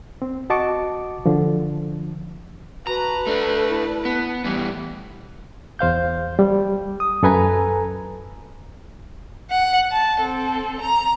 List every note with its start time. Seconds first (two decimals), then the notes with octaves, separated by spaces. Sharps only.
0.22 C4
0.50 F#4 D#5 A5 C#6 D6
1.26 D3 F3
2.87 F#4 B4 A5 A#5
3.27 A3 D4 A4
3.69 E4
4.05 B3
4.45 A2 E3 G3 B3
5.79 E2 C5 F5 G6
6.39 G3
7.00 D#6
7.23 F#2 A4 B4 G#5 A#5
9.50 F#5
9.92 A5
10.20 C4 A4
10.81 A#5